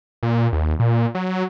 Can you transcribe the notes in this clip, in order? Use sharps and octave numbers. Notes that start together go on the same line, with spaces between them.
A#2
D#2
A#2
F#3